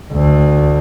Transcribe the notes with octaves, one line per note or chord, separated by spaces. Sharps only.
D2